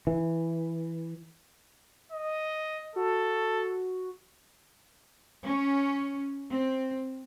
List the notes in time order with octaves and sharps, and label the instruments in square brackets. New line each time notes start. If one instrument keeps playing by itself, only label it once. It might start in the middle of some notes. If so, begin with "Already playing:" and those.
[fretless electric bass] E3
[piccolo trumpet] D#5
[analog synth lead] F#4 [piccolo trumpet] A4
[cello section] C#4
C4